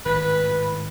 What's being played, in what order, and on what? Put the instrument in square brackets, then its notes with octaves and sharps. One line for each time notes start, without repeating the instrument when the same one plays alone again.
[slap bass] G#1 A2 [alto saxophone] B4